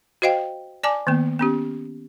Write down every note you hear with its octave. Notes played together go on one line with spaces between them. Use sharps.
F#4 C5 D#5 F5 G5
D5 G#5 A5 D6
D#3 A#3 B3
B3 C#4 G4